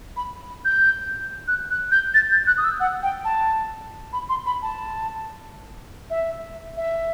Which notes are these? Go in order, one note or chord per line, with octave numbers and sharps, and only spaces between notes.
B5
G6
F#6
F#6
G6
A6
G6
F#6
D#6
E6
F#5
G5
A5
B5
C6
B5
A5
E5
E5